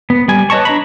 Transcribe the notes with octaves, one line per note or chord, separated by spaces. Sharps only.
B3
G3 G#5
B4 C#5 D#5 A5 C#6
D4 A#5 B5